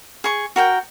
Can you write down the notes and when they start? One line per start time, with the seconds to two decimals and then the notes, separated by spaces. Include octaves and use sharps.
0.24 G#4 C#6
0.56 F#4 A#4 G5